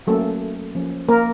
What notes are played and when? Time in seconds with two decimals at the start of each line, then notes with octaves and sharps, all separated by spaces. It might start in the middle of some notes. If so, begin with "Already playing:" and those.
0.07 F#3 A3 A#3 C#4 A4
0.75 F3 A#3 C#4
1.09 A#3 A#4